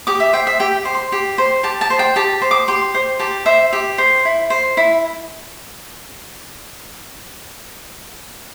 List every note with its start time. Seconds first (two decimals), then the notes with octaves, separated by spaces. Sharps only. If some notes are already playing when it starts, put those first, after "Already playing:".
0.07 G4 D6
0.20 E5
0.33 C5 G5
0.47 E5
0.60 G4 G5
0.85 C5
0.94 C6
1.12 G4
1.38 C5
1.63 G4 A5
1.81 A5
1.90 C5
1.99 G5
2.16 G4 A5
2.42 C5
2.51 D6
2.68 G4 C6
2.94 C5
3.19 G4 A5
3.46 C5 E5
3.73 G4
3.98 C5
4.25 E4
4.50 C5
4.77 E4